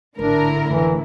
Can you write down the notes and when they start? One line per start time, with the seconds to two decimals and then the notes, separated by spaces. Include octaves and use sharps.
0.19 G#1 A2 D3 D4 E4 A#4
0.67 F1 E3